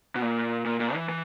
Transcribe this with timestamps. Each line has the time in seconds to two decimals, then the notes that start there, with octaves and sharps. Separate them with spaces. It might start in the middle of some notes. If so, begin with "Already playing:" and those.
0.15 B2
0.22 A#2
0.65 A#2
0.80 A#2
0.94 E3
1.09 E3